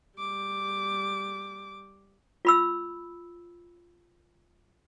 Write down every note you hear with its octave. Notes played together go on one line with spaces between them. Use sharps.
G3 D6
F4 B5 E6